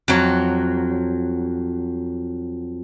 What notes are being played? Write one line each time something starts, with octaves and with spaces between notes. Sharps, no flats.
F2 F#3